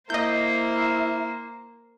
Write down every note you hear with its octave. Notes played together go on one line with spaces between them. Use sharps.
A#3 E4 C5 D#5 G6